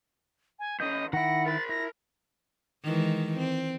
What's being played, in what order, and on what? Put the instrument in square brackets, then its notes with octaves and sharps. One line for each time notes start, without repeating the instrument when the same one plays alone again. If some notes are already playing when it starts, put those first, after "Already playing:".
[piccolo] G#5
[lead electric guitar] E3 C#4 [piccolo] D#5 [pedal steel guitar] G6
[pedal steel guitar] D#3 E4 [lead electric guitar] F#5 [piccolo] A#6
[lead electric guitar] A#4 B5 [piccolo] A6
[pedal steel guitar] E4 [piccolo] A#6
[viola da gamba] D#3 E3 G#3
C4